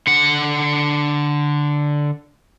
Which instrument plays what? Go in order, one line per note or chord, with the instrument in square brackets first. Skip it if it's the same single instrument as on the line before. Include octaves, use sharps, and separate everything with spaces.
[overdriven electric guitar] D3 F#5